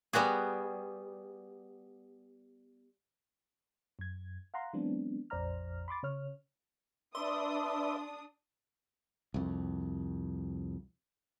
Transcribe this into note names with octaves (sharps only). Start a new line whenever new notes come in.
G3 B3 F#4 G#4
F#2 G#6
F5 F#5 A#5 C6
E3 F#3 G#3 B3 C4 D4
A#1 F2 C5 D5 A#5 F6
B5 C6 D6 A6
C#3 C#5 F6
D4 B4 D5 E5 C6 D#6
C2 F2